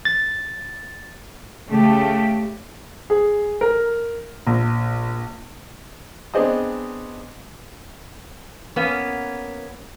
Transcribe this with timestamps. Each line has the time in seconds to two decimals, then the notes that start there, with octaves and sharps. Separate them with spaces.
0.05 A6
1.69 C#3 A3 G4
3.10 G#4
3.61 A#4
4.47 A#1
6.34 B3 C4 D4 G#4 C5 D#5
8.76 A#3 B3 C#4